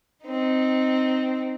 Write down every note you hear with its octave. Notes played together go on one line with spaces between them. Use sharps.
C4 D#4